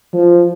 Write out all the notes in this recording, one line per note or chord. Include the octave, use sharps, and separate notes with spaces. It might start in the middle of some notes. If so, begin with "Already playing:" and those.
F3